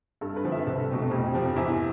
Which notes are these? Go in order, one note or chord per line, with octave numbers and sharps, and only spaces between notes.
G2 A4
B4
D3 F3 C4
E5
C2 A4
B2 A3 C4
F2 G4
C3 F3 C4
E2 E4